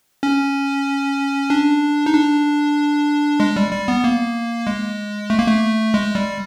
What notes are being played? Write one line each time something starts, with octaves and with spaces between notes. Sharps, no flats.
C#4
D4
D#4
D4
G#3
G3
G3
B3
A#3
G#3
A3
A#3
A3
G#3
G3